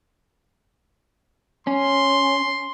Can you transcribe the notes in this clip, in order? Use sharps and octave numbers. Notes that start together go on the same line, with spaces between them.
C#4 C6